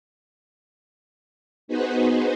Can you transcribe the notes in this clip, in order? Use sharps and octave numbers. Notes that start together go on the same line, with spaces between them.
B3 D#4 F#4 G#4 B4 C5